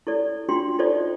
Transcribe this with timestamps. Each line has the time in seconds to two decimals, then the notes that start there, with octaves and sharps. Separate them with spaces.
0.07 E4 A4 D5
0.49 D4 F4 F#4 G5 C6
0.79 D#4 F4 A4 C5 D5 D#5